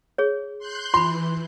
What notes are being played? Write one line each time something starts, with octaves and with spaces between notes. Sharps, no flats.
G#4 C#5
C6 F#6 G6
E3 F4 B5 C6